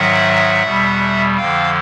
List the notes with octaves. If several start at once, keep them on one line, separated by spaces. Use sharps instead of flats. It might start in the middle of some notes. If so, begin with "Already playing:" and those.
Already playing: G#2 D#3 F#3 E5 F#5
E2 B2 G3
F2 D3 F3 F5 G5